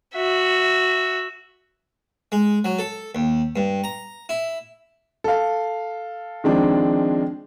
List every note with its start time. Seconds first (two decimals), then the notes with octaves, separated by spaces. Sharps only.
0.15 F#4 E5
2.32 G#3
2.65 F#3
2.79 A4
3.15 D#2
3.56 G2
3.84 A#5
4.29 E4
5.24 A4 F5
6.44 D#3 F3 G#3 C4 D4